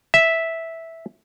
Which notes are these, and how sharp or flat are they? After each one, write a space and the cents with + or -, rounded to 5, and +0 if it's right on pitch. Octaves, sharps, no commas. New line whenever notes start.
E5 -5